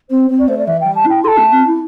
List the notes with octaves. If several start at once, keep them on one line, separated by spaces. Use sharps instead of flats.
C4 C5
C4
D5
A3 C5
D5
E3 E5
G3 G5
A5
E4 G5
A4 A5 C6
A3
C4
E4